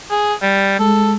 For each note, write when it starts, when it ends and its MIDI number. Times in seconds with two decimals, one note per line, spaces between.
0.11 0.34 68
0.42 0.76 55
0.79 1.16 56
0.79 1.12 69